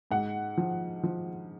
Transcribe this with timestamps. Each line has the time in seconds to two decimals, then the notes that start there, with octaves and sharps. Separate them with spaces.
0.11 G#2 F#5
0.57 F3
1.03 F3